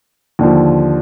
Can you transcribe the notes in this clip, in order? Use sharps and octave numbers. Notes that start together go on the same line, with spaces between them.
D#2 D3 F3